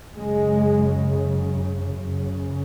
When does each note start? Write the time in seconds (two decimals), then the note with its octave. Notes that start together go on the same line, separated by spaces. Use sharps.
0.17 F#2 C#3 G#3
2.03 F#2 C#3